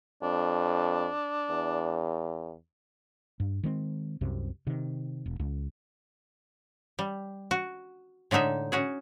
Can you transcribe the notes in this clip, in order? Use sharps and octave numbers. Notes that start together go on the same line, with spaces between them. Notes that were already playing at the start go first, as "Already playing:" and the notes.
F2 D4
E2
G2
D#3 G#3 C4
C2 F#2 C3
C3 D#3
E1
C#2
G3
F#4
A2 D3 G#3 D#4 E5
C#4 F#4 G#4